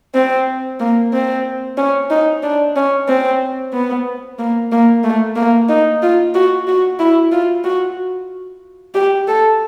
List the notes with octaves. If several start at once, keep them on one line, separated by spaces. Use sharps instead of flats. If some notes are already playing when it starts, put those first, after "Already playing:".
C4
A#3
C4
C#4
D#4
D4
C#4
C4
B3
A#3
A#3
A3
A#3
D#4
F4
F#4
F#4
E4
F4
F#4
G4
A4